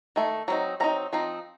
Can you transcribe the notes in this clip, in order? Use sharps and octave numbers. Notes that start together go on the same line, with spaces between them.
D#3 A3
F#3 C4 D#4
F#3 C4 D#4 A#5
F3 C4 D#4